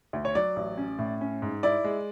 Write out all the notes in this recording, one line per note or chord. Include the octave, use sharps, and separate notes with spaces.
D2
C#5
F#3 D5
A1
C#4
A2
C#4
G#2
E4 D5
G#3